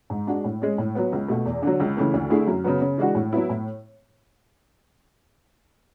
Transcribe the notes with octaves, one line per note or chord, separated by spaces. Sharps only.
G#2
G#3 D4 F#4
A2
G#3 C#4 G#4
A2
F#3 B3
C#2
B2 A3
E2
D3 F#3
C#2
C#3 E3 A3
D2
D3 A3 E4 G#4
F#2
C#3 F#3 B3
C#3
E3 G#3 D4 F#4
A2
F#3 B3 E4
A2